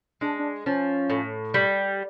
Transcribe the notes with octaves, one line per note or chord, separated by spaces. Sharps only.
G#3 D4
D4
F3 C#4
A2
G3